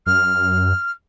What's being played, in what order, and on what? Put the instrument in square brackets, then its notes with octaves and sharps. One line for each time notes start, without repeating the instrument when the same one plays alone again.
[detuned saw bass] F#2 [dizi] F6